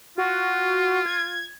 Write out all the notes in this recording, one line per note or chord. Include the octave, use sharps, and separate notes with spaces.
F4 F#4
G#6